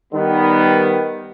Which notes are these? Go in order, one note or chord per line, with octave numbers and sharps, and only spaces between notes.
D#3 G3 B3